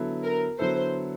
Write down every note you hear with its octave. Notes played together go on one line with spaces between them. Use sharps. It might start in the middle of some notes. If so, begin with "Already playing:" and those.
Already playing: D3 F#3 B3 E4 A4
A#4
D3 F#3 B3 E4 A4 C5